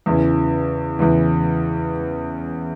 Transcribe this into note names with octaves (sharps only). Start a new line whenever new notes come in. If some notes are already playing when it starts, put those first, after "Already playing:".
E2 C#3 E3
E2 C#3 E3